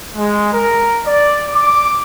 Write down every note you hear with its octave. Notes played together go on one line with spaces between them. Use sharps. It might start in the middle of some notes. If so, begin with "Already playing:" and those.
G#3
A#4
D5
D6